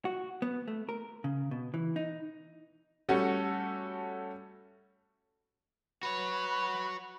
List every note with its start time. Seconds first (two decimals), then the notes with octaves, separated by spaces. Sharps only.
0.05 F#4
0.42 B3
0.68 A3
0.89 A#4
1.24 C#3
1.51 B2
1.74 E3
1.96 D#4
3.09 G3 A3 C#4 F#4 A4
6.03 F#4 B4 C#5 B5